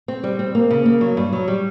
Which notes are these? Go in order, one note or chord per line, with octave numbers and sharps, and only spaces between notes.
C4
G3
C4
A#3
C#3
A#3
F#3
G2
F#3
G3